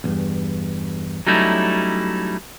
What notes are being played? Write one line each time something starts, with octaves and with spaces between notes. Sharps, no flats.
B1 E2 G2
F#3 G3 A3 C#4 D#4 E4